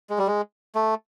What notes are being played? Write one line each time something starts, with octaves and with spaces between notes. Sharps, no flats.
G#3
G3
G#3
A3